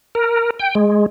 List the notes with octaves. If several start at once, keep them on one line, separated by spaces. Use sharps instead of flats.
A#4
G5
G#3